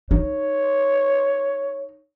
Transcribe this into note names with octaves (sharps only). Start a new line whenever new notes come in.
D#4 C#5